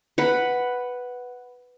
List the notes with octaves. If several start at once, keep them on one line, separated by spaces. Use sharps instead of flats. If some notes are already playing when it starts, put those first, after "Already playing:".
B4 F#5 B5